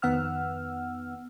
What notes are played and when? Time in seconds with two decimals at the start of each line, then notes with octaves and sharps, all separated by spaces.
0.02 F2 D#3 B3 F#5 E6 F6